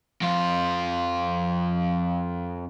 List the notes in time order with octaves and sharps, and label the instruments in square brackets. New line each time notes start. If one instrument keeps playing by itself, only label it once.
[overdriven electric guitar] F2 F4